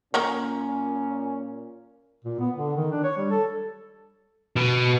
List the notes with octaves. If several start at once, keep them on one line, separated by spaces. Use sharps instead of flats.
A#2 A#3 C#4 A#4 C#5
A#2
B3
D3
D#3
D4
C#5
G3
A4
B2